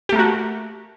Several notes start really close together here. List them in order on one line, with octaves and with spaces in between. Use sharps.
G4 A3 A#3 F#4